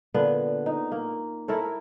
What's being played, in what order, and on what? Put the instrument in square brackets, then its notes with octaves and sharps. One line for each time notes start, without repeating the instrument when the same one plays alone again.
[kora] A#2 D3 B3
D#4
A#3
E4 A4 A#4 C#5